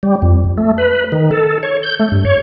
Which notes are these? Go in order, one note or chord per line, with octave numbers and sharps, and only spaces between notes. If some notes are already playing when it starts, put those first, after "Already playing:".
G3
F2
A3
B4
D#3
A4
C#5
G6
A3
G2
C#5